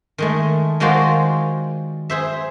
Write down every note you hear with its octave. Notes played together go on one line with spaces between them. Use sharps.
D#3 G#3 A3
D#3 G#3 F4 F#4 C5 D5
G#4 C5 E5